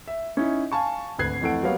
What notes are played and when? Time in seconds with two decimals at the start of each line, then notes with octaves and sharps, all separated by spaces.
0.08 E5
0.37 C#4 D#4 E4
0.72 F5 G#5 A5 C#6
1.18 G#1 D2 B4 F#6 G#6 C7
1.42 F2 E3 A3 A4 F#5 D7
1.63 F#3 G3 A#3 B3 C#5 F5